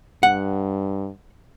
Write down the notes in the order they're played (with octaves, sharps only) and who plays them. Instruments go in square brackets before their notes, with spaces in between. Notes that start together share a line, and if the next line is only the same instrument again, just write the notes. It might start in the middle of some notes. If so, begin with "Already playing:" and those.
[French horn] G2 [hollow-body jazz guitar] F#5